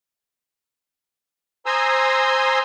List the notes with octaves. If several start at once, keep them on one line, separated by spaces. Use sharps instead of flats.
C5 G#5 A#5 C6 D#6 E6